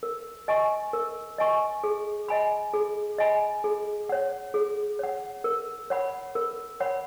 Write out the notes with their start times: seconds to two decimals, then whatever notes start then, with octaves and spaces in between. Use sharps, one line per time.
0.03 A#4
0.48 D#5 G#5 C#6
0.93 A#4
1.38 D#5 G#5 C#6
1.84 G#4
2.28 D#5 G#5 B5
2.74 G#4
3.18 D#5 G#5 B5
3.64 G#4
4.09 C#5 F#5
4.54 G#4
4.99 C#5 F#5
5.44 A#4
5.90 C#5 F#5 B5
6.35 A#4
6.80 C#5 F#5 B5